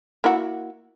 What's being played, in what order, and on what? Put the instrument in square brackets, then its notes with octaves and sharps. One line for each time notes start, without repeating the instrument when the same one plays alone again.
[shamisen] A#3 E4 F#4